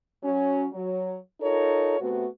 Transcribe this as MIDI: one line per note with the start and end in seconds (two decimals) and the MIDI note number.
0.23 0.66 54
0.23 0.66 61
0.73 1.18 54
1.40 1.97 63
1.40 1.97 65
1.40 1.97 69
1.40 1.97 70
1.40 1.97 73
2.00 2.27 48
2.00 2.27 57
2.00 2.27 59
2.00 2.27 66